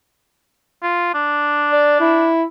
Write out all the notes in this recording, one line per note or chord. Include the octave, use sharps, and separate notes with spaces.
F4
D4
D5
E4